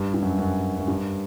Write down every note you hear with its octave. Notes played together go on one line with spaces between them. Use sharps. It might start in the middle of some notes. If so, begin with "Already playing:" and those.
Already playing: G2
G2
F#2
F#2
F#2
G2